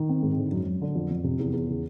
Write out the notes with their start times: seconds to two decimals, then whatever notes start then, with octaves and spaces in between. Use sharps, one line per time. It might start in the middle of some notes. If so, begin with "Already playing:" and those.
Already playing: D#3
0.09 C4
0.23 G#2
0.37 D3
0.52 F#2
0.66 F#2
0.82 D3
0.95 F2
1.10 F2
1.24 C3
1.39 E2
1.53 E2
1.68 C#3